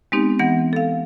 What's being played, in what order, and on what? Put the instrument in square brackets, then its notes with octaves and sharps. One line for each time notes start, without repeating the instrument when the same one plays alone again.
[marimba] G#3 B3 C4 D#4 G4
E3 B3 F#5 A#6
A4 F5